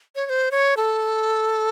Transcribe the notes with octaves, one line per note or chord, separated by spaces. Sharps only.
C#5
C#5
C5
C#5
A4